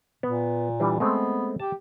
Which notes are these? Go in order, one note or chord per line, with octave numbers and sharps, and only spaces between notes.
A#2 B3
E3 G3 D4
G#3 A3 B3 C4
G4 A5